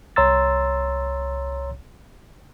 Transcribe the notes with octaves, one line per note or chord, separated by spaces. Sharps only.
C2 C#5 A#5 C6 E6 A6